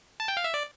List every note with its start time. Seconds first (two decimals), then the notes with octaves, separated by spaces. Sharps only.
0.20 A5
0.28 G5
0.37 F5
0.44 E5
0.54 D5